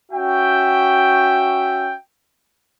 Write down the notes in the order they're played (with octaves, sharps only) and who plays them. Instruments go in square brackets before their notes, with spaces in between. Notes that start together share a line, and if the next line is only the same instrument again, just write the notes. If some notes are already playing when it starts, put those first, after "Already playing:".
[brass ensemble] C#4 F#4 E5 G5